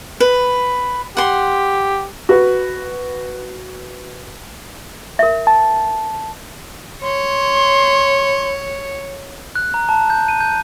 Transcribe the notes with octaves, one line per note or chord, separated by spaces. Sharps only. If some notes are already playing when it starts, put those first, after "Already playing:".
B4
G4 F#5 C6
F#4 B4
A#4 E5
A5
C#5 C6
F#6
A#5
A5
G6
D#7
G6